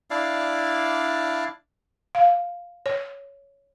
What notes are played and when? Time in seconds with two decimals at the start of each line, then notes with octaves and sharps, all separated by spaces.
0.10 D4 E4 D5 F5
2.15 F5
2.86 C#5